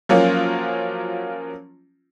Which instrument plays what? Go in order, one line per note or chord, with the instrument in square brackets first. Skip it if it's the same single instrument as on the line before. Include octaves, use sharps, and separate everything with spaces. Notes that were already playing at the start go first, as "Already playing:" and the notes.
[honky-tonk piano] F3 F#3 A#3 C#4 F4